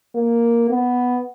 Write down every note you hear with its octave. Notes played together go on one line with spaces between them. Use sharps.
A#3
B3